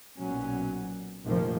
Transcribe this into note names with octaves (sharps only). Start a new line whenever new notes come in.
B1 A#2 F#3 C#4
F1 A#1 D#3 F3 A#3